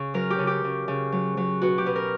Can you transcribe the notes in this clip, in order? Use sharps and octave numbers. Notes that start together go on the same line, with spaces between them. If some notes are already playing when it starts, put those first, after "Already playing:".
Already playing: C#3
F#3 A#4
G4
C#3
G4
C#3
C#3
F#3
F#3
B2 F#4
G4
B2
A#4